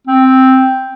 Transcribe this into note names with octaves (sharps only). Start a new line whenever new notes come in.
C4